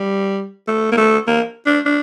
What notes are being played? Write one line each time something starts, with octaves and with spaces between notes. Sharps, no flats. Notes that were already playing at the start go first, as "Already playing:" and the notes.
Already playing: G3
A3
A#3
A3
A#3
D4
D4